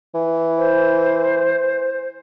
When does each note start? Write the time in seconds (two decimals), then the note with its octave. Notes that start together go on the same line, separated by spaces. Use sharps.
0.15 E3
0.58 C5